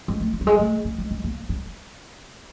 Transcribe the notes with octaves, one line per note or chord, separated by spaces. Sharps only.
G#3
A3
A3
G3
G#3
A3
A3
G#3
G#3
A#3
G#3